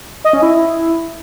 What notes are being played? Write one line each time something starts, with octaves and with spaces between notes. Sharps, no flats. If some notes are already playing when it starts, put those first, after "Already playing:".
D#5
C#4
E4